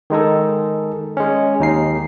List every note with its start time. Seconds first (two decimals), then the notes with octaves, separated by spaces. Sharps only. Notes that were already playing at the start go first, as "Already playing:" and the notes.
0.10 D#3 G#3 D#4 A4
1.17 G#3 C#4
1.60 D#2 D#4 C7